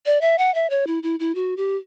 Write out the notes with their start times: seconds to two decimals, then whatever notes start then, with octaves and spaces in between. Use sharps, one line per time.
0.06 D5
0.21 E5
0.38 F#5
0.55 E5
0.70 C#5
0.87 E4
1.03 E4
1.20 E4
1.35 F#4
1.57 G4